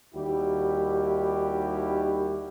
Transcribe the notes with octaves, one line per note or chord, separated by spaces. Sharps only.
D#2 D#3 G3 E4 F#4 G4